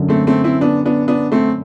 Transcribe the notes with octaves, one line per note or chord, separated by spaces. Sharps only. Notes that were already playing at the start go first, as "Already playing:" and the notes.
Already playing: F#2 D3 F#3
A3 C4
A3 C4
C4 E4
B3 D4
B3 D4
B3 D4
A3 C4